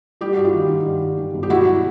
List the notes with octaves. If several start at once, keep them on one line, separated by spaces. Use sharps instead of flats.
G3 G4
G2 F#4
F4 G4
D#3
D#3
G2
G2
D#3
G1
G4
B1 E4 F#4